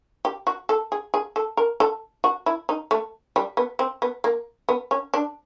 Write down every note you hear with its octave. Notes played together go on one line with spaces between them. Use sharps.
G4
F#4
A4
G#4
G#4
A4
A#4
A4
F#4
E4
D#4
A3
G3
B3
C4
B3
A#3
B3
C#4
D4